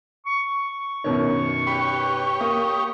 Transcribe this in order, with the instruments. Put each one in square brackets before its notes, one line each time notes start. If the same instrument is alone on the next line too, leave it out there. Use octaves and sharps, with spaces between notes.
[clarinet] C#6
[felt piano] F#2 B2 D#3 [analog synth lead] C#5
[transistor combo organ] G4 C#5 [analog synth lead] B4
[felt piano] A#3 [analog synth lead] D#6